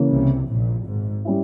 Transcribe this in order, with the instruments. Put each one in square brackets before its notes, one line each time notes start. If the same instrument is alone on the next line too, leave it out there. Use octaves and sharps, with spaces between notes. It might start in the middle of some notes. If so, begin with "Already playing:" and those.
Already playing: [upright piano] C#3 E3 A#3
[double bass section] C2 C3
A#1 A#2
G#1 G#2
[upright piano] G3 C#4 E4